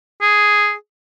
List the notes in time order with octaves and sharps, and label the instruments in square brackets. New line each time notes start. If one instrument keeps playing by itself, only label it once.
[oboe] G#4